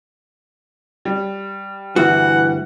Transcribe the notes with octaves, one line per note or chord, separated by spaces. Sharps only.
G3
D2 G2 E3 F#4 F#5